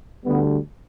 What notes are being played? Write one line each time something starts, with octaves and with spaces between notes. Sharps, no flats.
D2 D3 G3 B3